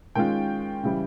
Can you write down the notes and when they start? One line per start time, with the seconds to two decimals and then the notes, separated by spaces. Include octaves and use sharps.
0.15 D#3 G#3 C#4 F4 G5
0.83 C#3 E3 G3